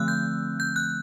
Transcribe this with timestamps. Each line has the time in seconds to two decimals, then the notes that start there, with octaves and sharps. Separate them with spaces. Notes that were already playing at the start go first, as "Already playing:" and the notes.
Already playing: D3 F3 A3 C4 E6 F#6
0.08 G6
0.60 G6
0.76 F#6